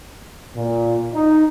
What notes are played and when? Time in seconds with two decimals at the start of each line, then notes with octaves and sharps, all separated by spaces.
0.57 A#2
1.15 D#4